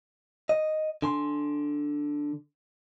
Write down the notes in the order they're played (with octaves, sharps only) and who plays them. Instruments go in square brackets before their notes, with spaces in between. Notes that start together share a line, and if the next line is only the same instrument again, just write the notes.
[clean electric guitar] D#5
D3 G#5 C6